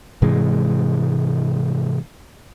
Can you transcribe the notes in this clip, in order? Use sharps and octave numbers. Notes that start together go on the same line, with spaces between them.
G#2 C3 E3 G#3